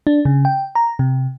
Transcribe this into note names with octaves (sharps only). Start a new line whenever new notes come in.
D4
C#3
G5
A#5
C3